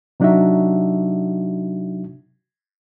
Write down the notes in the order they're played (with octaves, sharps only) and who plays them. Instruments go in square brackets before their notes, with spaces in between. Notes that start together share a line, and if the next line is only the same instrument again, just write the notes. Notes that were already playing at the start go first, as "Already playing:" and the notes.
[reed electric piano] C3 F#3 D4 D#4 F#4 E5